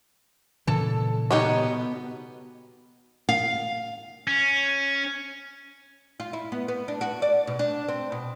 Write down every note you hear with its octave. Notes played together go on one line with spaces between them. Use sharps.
A#2 C#3 E3 A4
B2 B3 D#4 G4 C#5
F5
C#4
F4
E4
B3
B3
D4
F#4
D5
B2
D4
C4
B2